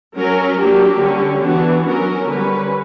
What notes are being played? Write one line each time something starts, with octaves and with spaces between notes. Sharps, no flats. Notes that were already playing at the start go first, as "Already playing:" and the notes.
F#3 C#4 A#4
F#3 A#3 D4 G4
D3 G3 C#4
E3 B3 D4 F#4
F#3 C#4 A#4
D3 G3 C#4 B4